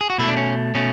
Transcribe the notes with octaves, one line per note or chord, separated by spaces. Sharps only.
G#4
F#4
B2 A3 E4
D4
C#4
B2 A3 C#4